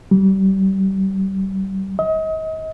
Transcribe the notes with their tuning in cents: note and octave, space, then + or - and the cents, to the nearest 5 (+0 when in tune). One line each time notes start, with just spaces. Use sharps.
G3 -30
D#5 +35